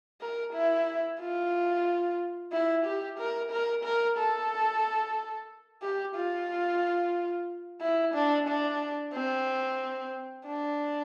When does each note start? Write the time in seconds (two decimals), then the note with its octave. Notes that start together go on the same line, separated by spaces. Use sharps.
0.21 A#4
0.53 E4
1.20 F4
2.52 E4
2.85 G4
3.19 A#4
3.51 A#4
3.84 A#4
4.18 A4
5.82 G4
6.16 F4
7.81 E4
8.14 D4
8.47 D4
9.13 C4
10.45 D4